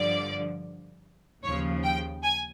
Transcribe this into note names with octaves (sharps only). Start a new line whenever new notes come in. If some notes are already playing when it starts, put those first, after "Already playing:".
Already playing: G2 D3 F3 D5
D#2 C#3 F3 C#5
G5
G#5